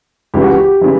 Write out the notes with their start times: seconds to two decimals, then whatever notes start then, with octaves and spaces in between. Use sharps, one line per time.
0.34 C#2 C#3 E3 G4
0.44 F#4
0.54 G4
0.81 C#3 E3